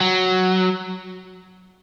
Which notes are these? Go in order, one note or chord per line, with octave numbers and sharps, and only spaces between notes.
F#3